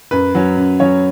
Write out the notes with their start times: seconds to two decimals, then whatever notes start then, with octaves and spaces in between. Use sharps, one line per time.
0.11 F#2 B4
0.35 F#3 C#4
0.57 F#2
0.80 F#3 C#4 C#5